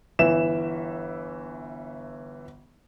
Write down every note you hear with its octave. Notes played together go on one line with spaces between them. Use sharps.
G1 E3 E5 E7